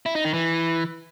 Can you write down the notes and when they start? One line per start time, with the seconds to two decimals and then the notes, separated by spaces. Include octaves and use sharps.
0.06 E4
0.15 D#4
0.24 D#3
0.34 E3